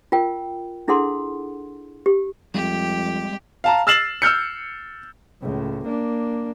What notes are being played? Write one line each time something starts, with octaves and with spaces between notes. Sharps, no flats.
F4 A#4 G5
D4 E4 G#4 A4 F#5 C6
G4
F2 G3 G#3 C4 G4
F5 A5 A#5
E6 F6 A6 C7 E7 F#7
E6 F6 G6 C#7
C#2 A2
A#3 D4